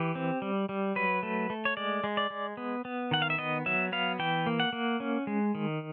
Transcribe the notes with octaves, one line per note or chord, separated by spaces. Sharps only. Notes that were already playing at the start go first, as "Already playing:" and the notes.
Already playing: E3 G4
C4
G3
G3
F#3 B4
A3
A3
C#5
G#3 D5
G#3
D5
G#3
B3
B3
D#3 F#5
F5
E5
B3 D#5
F#3 E5
B3 F5
E3 G5
A#3
F#5
A#3
C#4
G#3
D#3